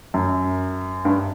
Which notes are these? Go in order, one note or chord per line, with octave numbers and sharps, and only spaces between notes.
F#2
G2